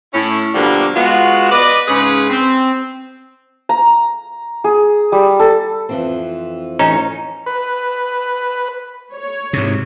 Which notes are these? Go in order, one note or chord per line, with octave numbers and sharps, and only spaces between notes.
A2 C#4 E4
B2 D3 F3 G3 A#3
G#3 B3 F4 F#4
B4 D5 D#5
G#2 C#3 C#4 G#4 B4
C4
A#5
G#4
G3
A4
F2 E3 C4
A1 C#4 D#4 A#5
B4
C#5
G#2 C3